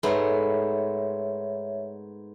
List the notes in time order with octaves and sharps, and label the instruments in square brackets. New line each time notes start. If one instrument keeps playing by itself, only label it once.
[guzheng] G#2 A3 B3 [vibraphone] C#5 E5